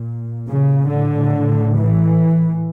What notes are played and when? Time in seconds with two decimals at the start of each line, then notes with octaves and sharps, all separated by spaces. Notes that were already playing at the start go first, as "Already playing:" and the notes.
Already playing: A#2
0.48 C#3
0.90 A2 D3
1.74 E3